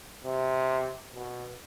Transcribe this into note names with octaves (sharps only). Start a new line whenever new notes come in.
C3
B2